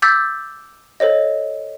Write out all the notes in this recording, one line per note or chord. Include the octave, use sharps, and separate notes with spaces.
D6 E6 G6 A6 B6
A4 C5 C#5 D#5